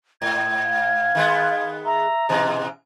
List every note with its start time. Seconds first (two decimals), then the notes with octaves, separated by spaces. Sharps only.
0.22 G#2 G#6
0.66 F5
1.15 D#3 G#3 B3
1.86 E5 A#5
2.29 G#2 B2 E3 D#5